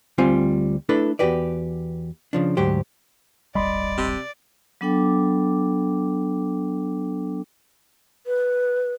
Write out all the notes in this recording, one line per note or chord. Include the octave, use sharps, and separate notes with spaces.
D2 G3 C4 F4 C5 G#5
A3 D4 E4 A4 B4
E2 A#2 F#4 G4 B4 D5
C#3 F3 D4
D2 G#2 F#3 G4 C5
D1 G1 G3 D5 D#5 B5 C6
C3
F#3 B3 D4 A4 G5 D6
B4